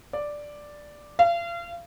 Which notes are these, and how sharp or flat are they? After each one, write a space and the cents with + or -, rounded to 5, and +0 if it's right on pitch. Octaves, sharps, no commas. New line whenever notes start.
D5 +0
F5 -35